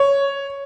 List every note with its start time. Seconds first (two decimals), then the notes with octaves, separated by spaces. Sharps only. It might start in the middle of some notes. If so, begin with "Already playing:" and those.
Already playing: C#5